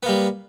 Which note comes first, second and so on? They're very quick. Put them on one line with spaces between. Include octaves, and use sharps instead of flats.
B3 A#3 G3